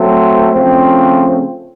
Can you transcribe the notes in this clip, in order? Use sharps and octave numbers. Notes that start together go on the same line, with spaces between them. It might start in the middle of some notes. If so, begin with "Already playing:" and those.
Already playing: F#3 A3 C4
C#3 F3 A3 C4